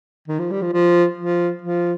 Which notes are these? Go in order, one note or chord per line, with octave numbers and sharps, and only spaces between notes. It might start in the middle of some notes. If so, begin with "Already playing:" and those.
D#3
F3
G3
F3
F3
F3
F3